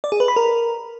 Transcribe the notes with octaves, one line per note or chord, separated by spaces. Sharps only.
D5
G#4
B4
B5
A#4